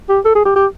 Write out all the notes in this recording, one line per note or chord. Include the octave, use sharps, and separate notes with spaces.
G4
A4
G#4
G4
G4